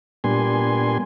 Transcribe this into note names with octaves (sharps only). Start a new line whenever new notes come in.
A#2 G3 B3 D4 G#5 C6